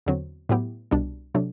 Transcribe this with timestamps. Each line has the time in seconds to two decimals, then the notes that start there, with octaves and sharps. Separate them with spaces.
0.06 E2 D3 F#3 C4
0.49 A2 F#3 B3 E4 G4
0.91 C2 B2 G3 D4
1.34 C3 F#3 A3 D4